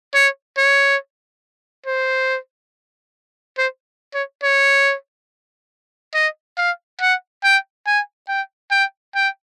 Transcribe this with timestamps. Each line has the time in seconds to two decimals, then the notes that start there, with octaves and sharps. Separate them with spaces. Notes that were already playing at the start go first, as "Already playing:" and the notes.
0.15 C#5
0.57 C#5
1.86 C5
3.58 C5
4.14 C#5
4.43 C#5
6.14 D#5
6.58 F5
7.01 F#5
7.44 G5
7.86 G#5
8.28 G5
8.71 G5
9.15 G5